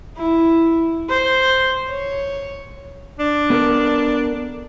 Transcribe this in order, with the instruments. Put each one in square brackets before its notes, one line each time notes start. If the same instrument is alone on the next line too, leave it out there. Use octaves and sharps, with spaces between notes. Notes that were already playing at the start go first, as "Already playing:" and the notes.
[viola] E4
C5
C#5
[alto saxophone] D4
[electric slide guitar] B3 A4 A#4